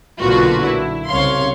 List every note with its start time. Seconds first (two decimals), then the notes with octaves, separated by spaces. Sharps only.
0.22 B1 A#2 D3 F4 F#4 B4
0.64 E4
1.08 C2 C#3 C#5 F5 C6